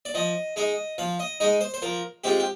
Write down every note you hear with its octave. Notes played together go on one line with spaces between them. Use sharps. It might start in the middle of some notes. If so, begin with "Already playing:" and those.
D5
F3 D#5
G#3 D#4 D#5
F3 F5
D#5
G#3 D#4 D#5
C5
C5
F3 A#4
G#3 C4 F4 G4
G4